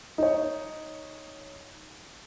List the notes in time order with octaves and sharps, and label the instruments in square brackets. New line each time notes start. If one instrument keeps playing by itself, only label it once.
[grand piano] D#4 C#5